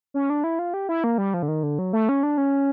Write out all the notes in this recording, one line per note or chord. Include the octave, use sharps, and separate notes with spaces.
C#4
D4
E4
F4
G4
E4
A#3
G3
F3
D3
D#3
D3
F#3
A3
C#4
D4
C#4